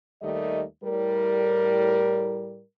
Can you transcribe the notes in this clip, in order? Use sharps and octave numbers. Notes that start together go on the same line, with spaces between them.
D#2 D#3 G3 A3 D#5
A2 G3 A#4